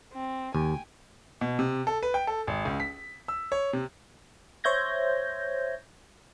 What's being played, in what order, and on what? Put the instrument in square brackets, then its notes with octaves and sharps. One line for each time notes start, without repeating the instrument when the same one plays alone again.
[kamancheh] C4
[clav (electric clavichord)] D#2 [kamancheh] G5 G#5
[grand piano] B2
C3
A4
B4
G5
A4
G#1
C#2
B6
E6
C#5
C3
[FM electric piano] C5 C#5 E5 G6 G#6 A#6